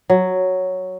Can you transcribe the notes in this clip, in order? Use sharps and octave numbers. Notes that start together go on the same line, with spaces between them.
F#3